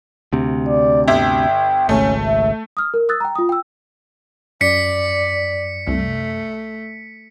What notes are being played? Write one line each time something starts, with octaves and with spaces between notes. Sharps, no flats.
D2 C3
D5
G1 E5 G5
G#1 C#2 A3 C#4
E5
D#6 F6
A#4
D#6 E6 F#6 A6
G5 A#5
F4 D#6
G5 E6
F#2 D5 B6 C#7
C2 A3